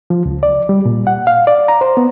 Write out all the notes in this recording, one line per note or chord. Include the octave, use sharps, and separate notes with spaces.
F3
C#2
D5
G3
A#2
F#5
F5
D5
A#5
C5
B3